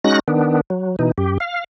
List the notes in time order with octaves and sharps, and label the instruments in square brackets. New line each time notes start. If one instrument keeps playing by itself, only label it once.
[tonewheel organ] G#3 C#4 D#4 F#4 F#6 A#6
D#3 B3 D4
F#3
B2 E3 D#4
F#2 G4
F5